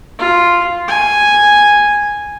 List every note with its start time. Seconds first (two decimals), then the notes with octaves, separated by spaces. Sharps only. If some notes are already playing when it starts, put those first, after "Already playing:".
0.19 F4
0.88 G#5